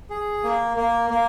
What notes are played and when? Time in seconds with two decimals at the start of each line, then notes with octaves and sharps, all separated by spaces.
0.10 G#4
0.43 A#3
0.77 A#3
1.10 A#3